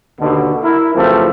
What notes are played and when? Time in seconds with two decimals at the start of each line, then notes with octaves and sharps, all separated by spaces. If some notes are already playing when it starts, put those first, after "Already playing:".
0.20 D#2 B2 D3
0.63 E4 A#4
0.95 F#2 C#3 E3 F3 A3 C4